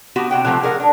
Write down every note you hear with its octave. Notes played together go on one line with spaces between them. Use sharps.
B3 F#4 G4
C3 F#5 G5
C3 F3 F#3 G#3 A3
G#4 A#4 C#5 F#5
D4